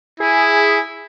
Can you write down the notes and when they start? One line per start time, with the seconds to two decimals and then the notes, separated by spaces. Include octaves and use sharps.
0.20 E4 G#4